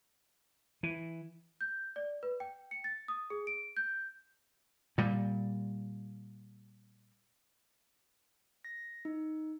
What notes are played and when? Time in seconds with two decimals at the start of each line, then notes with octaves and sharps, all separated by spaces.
0.83 E3
1.61 G6
1.96 D5
2.23 B4
2.40 G5
2.71 C#7
2.84 A6
3.08 D#6
3.30 G#4
3.47 D7
3.77 G6
4.98 A#2 G3
8.65 A#6
9.05 D#4